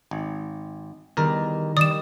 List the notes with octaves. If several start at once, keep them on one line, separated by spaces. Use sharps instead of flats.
G#1
E2 D#3 G3 A#4
D#3 G3 D5 D#6 E7